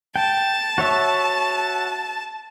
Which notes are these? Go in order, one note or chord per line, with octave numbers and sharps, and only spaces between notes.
G5 A5
F#4 C#5 E5